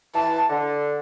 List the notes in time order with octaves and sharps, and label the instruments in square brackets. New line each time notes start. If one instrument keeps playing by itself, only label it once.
[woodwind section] E3 [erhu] A5
[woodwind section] D3